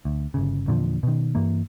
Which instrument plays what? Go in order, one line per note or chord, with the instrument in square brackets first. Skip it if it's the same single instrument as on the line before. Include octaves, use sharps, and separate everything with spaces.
[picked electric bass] D2
G1 C#3
E2 A#2 D3 F3
B2 D#3
G2 E3 A#3